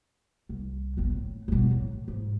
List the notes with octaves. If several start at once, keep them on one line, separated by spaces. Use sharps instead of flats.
C2
G1 C4
A2
G2 B2
A1 A2
G#2